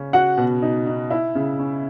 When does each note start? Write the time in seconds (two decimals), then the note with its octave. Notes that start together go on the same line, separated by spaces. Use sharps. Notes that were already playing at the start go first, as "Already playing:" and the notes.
Already playing: C#3 C#4
0.13 F#4 F#5
0.37 B2
0.62 D#4
0.87 D#4
1.10 E4
1.35 C#3
1.59 C#4